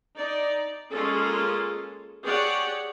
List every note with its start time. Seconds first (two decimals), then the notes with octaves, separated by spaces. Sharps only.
0.17 D#4 D5
0.92 G#3 A#3 C#4 F4 G#4 A4
2.25 G4 G#4 C#5 D5 F#5